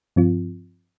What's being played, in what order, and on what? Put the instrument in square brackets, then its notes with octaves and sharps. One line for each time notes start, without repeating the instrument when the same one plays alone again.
[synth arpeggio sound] G2 F3 C4 F4